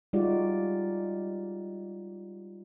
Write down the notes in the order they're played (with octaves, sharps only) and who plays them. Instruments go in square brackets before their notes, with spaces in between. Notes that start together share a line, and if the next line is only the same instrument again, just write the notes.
[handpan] G3 G#3 D#4 F4 F#4 D5